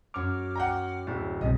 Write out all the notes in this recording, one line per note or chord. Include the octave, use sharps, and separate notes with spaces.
F#2 C#6 D6 F6
F#5 G5 A#5
D1 E4
B1 G2 C3 D#5